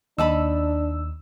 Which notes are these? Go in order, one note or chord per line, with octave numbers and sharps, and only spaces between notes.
D#2 D4 D#4 A5 B5 E6